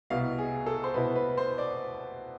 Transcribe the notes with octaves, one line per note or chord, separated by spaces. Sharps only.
C2 B2 B3 E4 F5
G#4
A4
C5
C2 B2 B3 E4 B4
B4
C5
D5